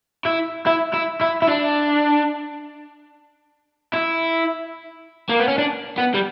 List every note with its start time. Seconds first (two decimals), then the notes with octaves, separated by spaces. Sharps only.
0.25 E4
0.66 E4
0.93 E4
1.21 E4
1.42 E4
1.48 D4
3.94 E4
5.29 A#3
5.40 B3
5.48 C#4
5.58 D4
5.98 B3
6.15 G3